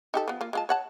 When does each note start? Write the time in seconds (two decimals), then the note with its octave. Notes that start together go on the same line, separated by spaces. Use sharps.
0.14 D#4 G4 A4
0.28 F3 B3
0.41 A#3 F4
0.53 G#3 F4 A5
0.69 C#5 F#5 A5